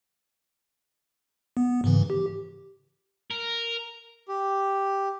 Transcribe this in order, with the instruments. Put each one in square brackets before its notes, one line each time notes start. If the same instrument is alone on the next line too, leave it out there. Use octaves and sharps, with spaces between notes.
[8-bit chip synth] B3
G#2 C#3 E3
G4
[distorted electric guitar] A#4
[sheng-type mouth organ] G4